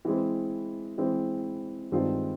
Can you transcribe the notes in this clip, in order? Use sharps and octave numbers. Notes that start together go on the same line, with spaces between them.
E3 G#3 C4
E3 G#3 C4
G2 D#3 G#3 C4 F4